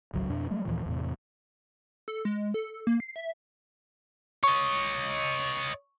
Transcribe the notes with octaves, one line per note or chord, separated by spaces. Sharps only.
G#1 C#2 F#3
F2 B2 D4
F#3 G3 A3
D#2 A#2 E3 F3
E2 A2 C3
A4
G#3
A4
A#3
C7
E5
C#5 D#5 C#6